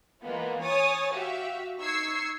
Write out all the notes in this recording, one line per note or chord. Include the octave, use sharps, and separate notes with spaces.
E3 G#3 A#3 B3 F4
C#5 G#5 D#6 A6
F#4 G4 E5 F5
D#4 C#6 E6 G#6 C7